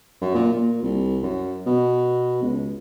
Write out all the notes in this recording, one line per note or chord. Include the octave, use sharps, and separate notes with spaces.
F#2
A#2
A#2
C2
F#2
B2
C#2